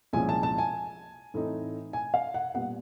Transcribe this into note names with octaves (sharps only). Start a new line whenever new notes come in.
C2 A#2 F3 G#3 C#4 G#5
A5
A5
G#5
A2 E3 A3 C4 D#4
G#5
F5
F#5
A#2 G3 B3 F#5